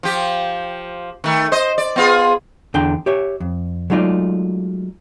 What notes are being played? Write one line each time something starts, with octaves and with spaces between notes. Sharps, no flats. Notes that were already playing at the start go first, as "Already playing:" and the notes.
F3 G4
D#3 A3
C5 D#5
D5
B3 F4 G#4
E2 D3 D4 G5
G4 C#5 E5
F2
F#3 G#3 A3 D#4 F4 D5